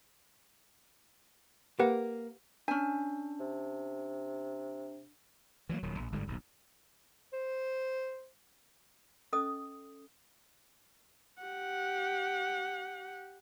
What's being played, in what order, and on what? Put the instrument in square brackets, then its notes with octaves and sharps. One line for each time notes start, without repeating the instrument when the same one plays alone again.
[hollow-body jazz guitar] A#3 [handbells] G4 B4 F#5
[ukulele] C#4 G#5 [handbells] D4
[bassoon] C3
[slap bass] E3 F#3 G3 A#3
D#1 D#3 F#3
A#1
G1 G#2 D3 G3
D#1 B1 G#2
[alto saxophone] C5
[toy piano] C#4 A4 D#5 D#6
[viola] G4 F#5